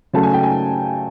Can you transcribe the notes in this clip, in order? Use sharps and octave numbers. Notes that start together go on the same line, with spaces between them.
C#3 F#3 A3 A5
G#5
G5
G#5